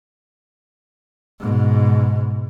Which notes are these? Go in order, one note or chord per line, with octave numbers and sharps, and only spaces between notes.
G#2 B2